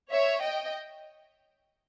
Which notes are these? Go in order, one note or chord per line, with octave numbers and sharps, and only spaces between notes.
C#5 E5
D#5 G5